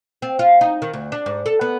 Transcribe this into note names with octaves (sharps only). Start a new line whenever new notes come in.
C4
F4
D#4
D#3
D2
D4
G#2
A4
B3